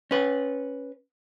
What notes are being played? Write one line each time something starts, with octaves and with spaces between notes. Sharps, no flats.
C#4 B4